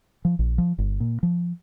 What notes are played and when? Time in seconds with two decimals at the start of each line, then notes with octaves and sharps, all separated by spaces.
0.25 F3
0.39 A#1
0.58 F3
0.78 G1
1.00 A#2
1.23 F3